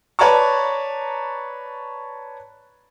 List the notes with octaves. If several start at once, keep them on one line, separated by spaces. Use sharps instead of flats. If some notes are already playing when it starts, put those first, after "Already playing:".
B4 C#5 D5 A5 A#5 C#6